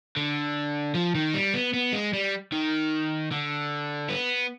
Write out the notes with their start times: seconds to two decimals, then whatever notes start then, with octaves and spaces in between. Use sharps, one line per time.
0.16 D3
0.95 F3
1.15 D#3
1.34 G3
1.54 B3
1.74 B3
1.93 G#3
2.13 G3
2.52 D#3
3.31 D3
4.09 B3